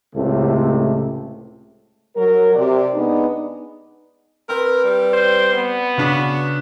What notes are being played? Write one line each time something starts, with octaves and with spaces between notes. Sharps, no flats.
C#2 A2 C3 A3
F#3 A#4
C3 D5
G#3 B3 D4 D#4
C4 A#4 B4 G5
G3
C5
B3
C#3 D4 F#4 B6